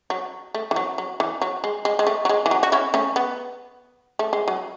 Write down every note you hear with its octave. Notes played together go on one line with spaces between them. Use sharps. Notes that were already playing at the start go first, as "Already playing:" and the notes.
F#3
A3
E3
F#3
F#3
E3
F#3
G#3
G#3
G#3
A3
F#3
G#3
E3
F#3
F#4
C#4 E4
A3 C#4
B3
A3
G#3
F#3